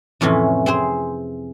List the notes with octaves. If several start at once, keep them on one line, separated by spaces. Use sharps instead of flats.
F2 A2 C3 E3 C#4
C4 G#4 C5